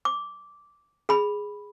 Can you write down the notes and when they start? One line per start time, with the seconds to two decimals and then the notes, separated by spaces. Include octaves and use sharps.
0.05 D6
1.09 G#4 B5